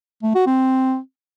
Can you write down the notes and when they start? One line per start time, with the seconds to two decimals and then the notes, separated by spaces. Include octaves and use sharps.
0.23 A3
0.35 F#4
0.47 C4